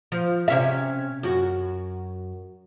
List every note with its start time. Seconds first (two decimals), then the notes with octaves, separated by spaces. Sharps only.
0.12 F3
0.48 C3 C#4 E5
1.23 F#2 F#4